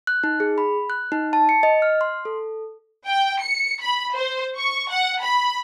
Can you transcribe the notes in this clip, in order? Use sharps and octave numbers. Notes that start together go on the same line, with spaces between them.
F#6
D#4
G#4
B5
F#6
D#4
A5
C#7
D#5
F6
C6
A4
G5
C#7
B5
C5
C#6
F#5
B5